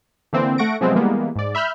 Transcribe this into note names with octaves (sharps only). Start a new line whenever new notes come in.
D3 E3 A#3 C4
A3 F#5 C#6 A#6 D7
C3 F3 F#3 G#3 B3 C4
E3 G3 G#3 A#3 B3
G#2 D5
E5 B5 F6 G6